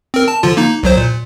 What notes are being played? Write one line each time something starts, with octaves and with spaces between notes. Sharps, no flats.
C4 A#4
A5
D3 F3 F4
A#3 D#4
C2 F#3 C5
A#2